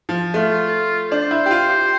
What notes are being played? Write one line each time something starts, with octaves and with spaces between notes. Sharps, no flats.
F3
A3 F4
D4 C5
E4
G4
F4
G4